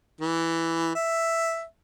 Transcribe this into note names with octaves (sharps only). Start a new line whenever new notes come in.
E3
E5